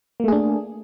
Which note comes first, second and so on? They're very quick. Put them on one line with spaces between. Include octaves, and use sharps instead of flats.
A#3 A3 G#4 D4